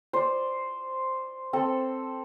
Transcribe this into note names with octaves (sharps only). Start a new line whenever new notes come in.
C5 D5
C4 A4